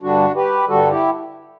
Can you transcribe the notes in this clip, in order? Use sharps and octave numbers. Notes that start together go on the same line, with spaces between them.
G2 D3 G3 D4 F#4
G4 B4
G2 D3 G3 F#4 A4
E4 G4